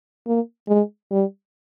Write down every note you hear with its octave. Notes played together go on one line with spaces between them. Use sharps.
A#3
G#3
G3